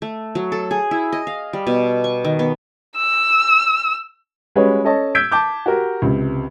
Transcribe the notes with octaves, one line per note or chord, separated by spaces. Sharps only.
A3
F#3
A4
G#4
E4
D#5
F5
G3
B2
C#6
D#3
B3
E6
G3 G#3 C#4 F#4 B4 C#5
C#4 A4 C#5 D#5 A5
E6 G6 G#6 B6 D7
A5 D6 G6
F#4 G4 A#4
C#2 C3